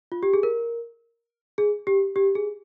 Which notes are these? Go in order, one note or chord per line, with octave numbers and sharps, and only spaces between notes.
F4
G4
G#4
A#4
G#4
G4
G4
G#4